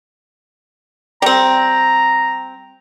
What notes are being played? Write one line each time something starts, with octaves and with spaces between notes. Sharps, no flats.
G3 C4 A#5